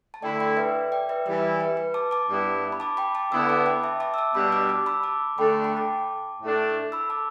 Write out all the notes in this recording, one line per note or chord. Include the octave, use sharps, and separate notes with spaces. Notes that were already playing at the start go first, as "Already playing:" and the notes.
A5
D3 A3 E4 D5 G5
D5 G5
B4 E5
D5 G5
B4 E5
E3 G3 E4 B4 E5
B4
B4
A5 D6
A5 D6
G2 G3 B3 E4
B5
A5 D6
G5 B5
A5 D6
D3 B3 E4 B5 E6
A5 D6
G5 B5
E5 A5
A5 D6
E6
A5 D6
B2 G3 D4 B5 E6
A5 D6
A5 D6
B5 E6
A5 D6
D3 A3 D4 G5 B5
G5 B5
A5 D6
A2 A3 D4
B5 E6
A5 D6